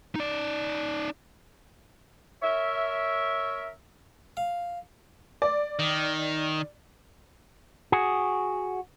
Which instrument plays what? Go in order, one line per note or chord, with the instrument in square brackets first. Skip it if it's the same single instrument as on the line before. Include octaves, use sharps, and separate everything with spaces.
[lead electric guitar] D#4 D5
[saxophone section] A#4 C#5 E5
[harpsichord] F5
[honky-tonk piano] D5
[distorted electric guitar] D#3
[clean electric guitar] F#4 G#4